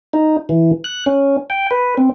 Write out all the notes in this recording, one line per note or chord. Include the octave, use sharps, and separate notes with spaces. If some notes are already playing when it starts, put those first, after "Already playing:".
D#4
E3
F#6
C#4
G5
B4
C4